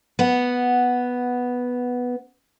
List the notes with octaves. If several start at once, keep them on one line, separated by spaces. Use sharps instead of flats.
B3 F#5